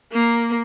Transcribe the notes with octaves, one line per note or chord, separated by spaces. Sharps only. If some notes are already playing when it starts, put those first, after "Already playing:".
A#3